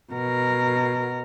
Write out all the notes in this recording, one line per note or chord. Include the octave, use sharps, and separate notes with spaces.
B2 A#4